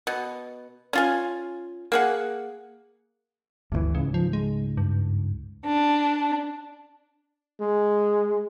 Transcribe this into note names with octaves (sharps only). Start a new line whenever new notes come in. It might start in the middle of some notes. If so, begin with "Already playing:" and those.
B2
C#4 F4 G#5
A#3 G#4 F#5
G1 D2 C#3 E3
C#2 G#2 C#3
F3
G#3
G2
D4
G#3